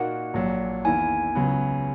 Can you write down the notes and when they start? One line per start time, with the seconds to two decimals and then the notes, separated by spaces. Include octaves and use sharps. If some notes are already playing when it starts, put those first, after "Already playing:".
Already playing: A#2 A#3 D#4 F#4 A#4 F#5
0.34 A#1 A#2 F#3
0.85 E2 D#3 A#3 E4 G#5
1.35 C#2 C#3 F#3 B3